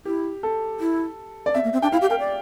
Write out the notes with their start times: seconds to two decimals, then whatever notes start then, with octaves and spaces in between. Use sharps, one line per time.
0.05 E4 G4
0.43 A4
0.80 E4
1.46 D5
1.55 C4 E5
1.64 A#3
1.73 C4
1.82 D4 G5
1.92 E4 F5
2.01 G4
2.10 A#4 G5
2.20 D5